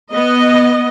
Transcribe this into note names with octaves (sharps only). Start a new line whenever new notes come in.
B3 D#5